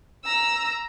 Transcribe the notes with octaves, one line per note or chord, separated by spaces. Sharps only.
A#5 E6